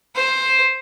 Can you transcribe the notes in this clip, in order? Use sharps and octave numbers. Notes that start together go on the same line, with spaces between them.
C5